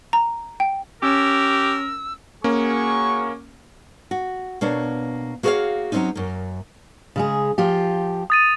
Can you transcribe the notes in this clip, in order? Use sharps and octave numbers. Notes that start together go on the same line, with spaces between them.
A#5
G5
C#4 G4 A#4 E6
A#3 C#4 F#4 G#4 C#6
F#4
B2 A#3 D4 C#5
A#3 F#4 G#4 B4 C#5 F5
F#3 A3 C4 C#4 D#4
F#2 A#3
C#3 G#3 G#4
F3 F4 G4
D#6 A6 D#7